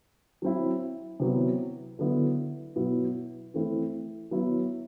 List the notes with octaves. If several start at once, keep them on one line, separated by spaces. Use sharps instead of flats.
F#3 C4 E4
C3 F#3 B3 E4
D3 F#3 B3 E4
B2 F#3 B3 E4
E3 A3 C4 E4
F#3 B3 E4